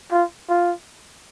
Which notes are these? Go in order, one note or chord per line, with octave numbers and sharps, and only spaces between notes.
F4
F4